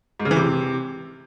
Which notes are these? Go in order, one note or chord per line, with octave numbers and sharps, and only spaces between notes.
G#2
C#3
E3
C3